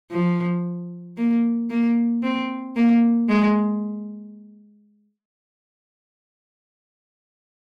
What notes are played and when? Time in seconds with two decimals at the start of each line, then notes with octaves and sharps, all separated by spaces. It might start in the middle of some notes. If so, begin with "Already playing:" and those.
0.11 F3
1.17 A#3
1.70 A#3
2.23 C4
2.76 A#3
3.29 G#3